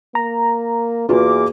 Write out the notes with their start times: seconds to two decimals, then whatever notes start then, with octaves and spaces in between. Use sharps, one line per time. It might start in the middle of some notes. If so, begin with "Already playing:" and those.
0.15 A#3 A#5
1.09 E2 A#3 F4 F#4 G#4 B4 D6